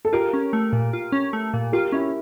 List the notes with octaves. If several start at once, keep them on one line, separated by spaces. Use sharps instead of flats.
A4
F4 G4 A#4
C#4
A3
A#2
F4
C#4
A3
A#2
F4 G4 A#4
C#4 E4 G4